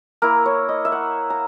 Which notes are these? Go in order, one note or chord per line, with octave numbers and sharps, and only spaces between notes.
A#3 E4 A#4
C#5
D#5
E5
F#5
A#5